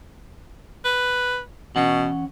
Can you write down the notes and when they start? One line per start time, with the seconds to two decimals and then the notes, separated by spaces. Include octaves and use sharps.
0.85 B4
1.76 B2 E3 C#4 F#5